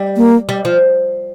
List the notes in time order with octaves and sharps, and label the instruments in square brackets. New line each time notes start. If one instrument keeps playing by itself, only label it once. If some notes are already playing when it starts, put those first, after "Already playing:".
Already playing: [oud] G3
[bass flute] A#3
[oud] G3
F3